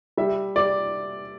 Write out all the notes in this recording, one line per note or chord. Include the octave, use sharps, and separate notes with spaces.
G3 E5
G3 D5